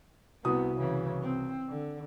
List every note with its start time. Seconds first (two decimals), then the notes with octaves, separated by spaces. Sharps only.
0.45 C2 C3 B3 F#4 D#6
0.78 C#3 E3
1.23 C4
1.69 D3